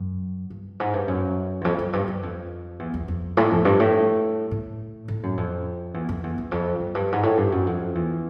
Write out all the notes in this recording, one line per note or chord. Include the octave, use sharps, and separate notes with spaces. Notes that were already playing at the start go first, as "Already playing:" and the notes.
Already playing: F#2
G2
G#2
G2
F#2
E2
F2
F#2
G2
F#2
F2
E2
E2
F2
A2
F2
G2
A2
A2
A2
F#2
F2
E2
F2
E2
E2
F2
F#2
G2
G#2
A2
G2
F#2
F2
E2